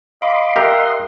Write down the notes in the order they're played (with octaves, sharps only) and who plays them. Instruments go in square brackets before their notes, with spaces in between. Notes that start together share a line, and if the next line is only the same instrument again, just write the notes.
[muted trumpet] D#5 [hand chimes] F5 [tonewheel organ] B5 C6 D6
[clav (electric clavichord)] G4 A#4 [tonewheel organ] D#5 F#5 C6 [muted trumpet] E5